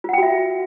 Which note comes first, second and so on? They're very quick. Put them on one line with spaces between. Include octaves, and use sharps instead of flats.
F4 F#5 G5 F#4 E5